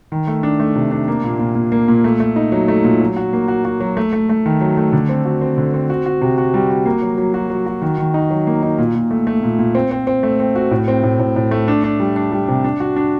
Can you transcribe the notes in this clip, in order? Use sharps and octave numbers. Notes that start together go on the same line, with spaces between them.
D#3
A3
D4
A3
C3
D4
A#3
A#2
A#2
A#2
A#3
A#2
A3
A3
D#4
F#3
A3
A#2
F#3
F#4
A#3
F#4
F#4
F#3
A3
A3
A3
D#3
F#3
A3
D3
C4
F#4
C4
D3
C4
F#4
F#4
C3
F#4
G3
F#4
A#3
F#3
F#3
F#4
F#3
F#4
D#3
D#3
D#4
F#3
A#3
D#4
A#2
A#2
A3
A3
A#2
A#2
C4
C4
C4
A3
C4
F#4
A2
C4
A2
A2
A2
A3
D4
D4
G3
D4
G3
C3
D4
F#4
D4